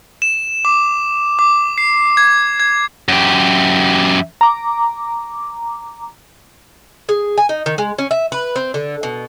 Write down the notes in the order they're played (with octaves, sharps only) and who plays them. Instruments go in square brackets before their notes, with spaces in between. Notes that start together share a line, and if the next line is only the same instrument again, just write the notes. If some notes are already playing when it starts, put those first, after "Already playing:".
[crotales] E7
D6
D6
C7
G#6
G#6
[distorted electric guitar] F#2 G4
[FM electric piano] A#5 D6
[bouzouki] G#4
G#5
D#4
D#3
G#3
C#4
E5
B4
C4
D3
B2